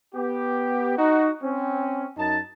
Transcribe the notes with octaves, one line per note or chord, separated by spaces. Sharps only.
B3 G4
D#4 F#4
C4 C#4
F#2 D#4 A5